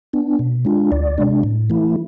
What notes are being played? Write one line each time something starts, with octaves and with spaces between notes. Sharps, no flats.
B3 D4
B2
G#3 D4 F4
D2 D5
C3 G#3 D4
A2
E3 A3 E4